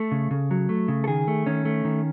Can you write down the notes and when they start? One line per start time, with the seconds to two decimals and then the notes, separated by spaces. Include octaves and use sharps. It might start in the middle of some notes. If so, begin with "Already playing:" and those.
Already playing: A3 A4
0.12 C#3
0.31 C#3
0.51 F#3
0.69 A3
0.88 C#3
1.04 A4
1.08 D#3 G#4
1.28 A3
1.46 D#3 C#4
1.65 A3
1.85 D#3